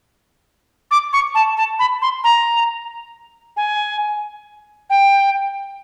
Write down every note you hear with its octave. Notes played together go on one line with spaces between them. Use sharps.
D6
C#6
A5
A5
B5
C6
A#5
G#5
G5